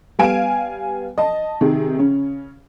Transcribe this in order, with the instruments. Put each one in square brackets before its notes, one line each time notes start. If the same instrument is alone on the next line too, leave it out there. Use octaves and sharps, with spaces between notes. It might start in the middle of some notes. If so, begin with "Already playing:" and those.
[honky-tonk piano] G3 B3 F5 G#5 D7 E7
D#5 A5
C3 D#3 G#4
C#3 C#4